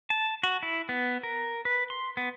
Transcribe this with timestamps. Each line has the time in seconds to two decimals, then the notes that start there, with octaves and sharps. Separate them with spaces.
0.10 A5
0.43 F#4
0.63 E4
0.89 B3
1.23 A#4
1.65 B4
1.90 C6
2.17 B3